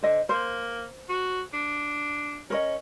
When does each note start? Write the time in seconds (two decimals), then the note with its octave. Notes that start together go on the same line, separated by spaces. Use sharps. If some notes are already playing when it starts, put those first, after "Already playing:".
0.03 D3 C5 D#5
0.29 A#3 C5
1.09 F#4
1.53 D4
2.50 C#4 A#4 C#5 D#5